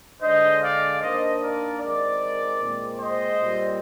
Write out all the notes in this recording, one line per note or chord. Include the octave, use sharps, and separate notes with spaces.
D3 G#3 D4 C5 D#5
D5 F5
D#3 A#3 D4 C5 D#5
A#4 D5
D#3 G#3 C4 A#4 D5
A#2 G#3 C4
C5 D#5
A#2 G3 C4